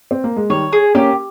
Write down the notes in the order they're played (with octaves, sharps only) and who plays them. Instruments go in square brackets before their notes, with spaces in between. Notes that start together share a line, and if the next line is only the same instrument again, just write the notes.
[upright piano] C4
A#3
G#3
[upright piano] D#3 G3 [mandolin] C#5
[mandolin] G#4
[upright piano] A#3 C#4 [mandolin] G4